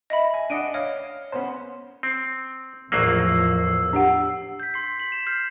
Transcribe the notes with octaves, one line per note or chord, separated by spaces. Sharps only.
D#5 E5 B5
G#5
D4 D#5 F#5 D7 D#7
C#5 D#5 F5
B3 C#4 C5
C4
A#1 E2 A2 F3 F#3 A#3 E6 C7
D4 G4 F#5
G6 B6
C6 C7
B6 F#7
E7
F6 G6 C7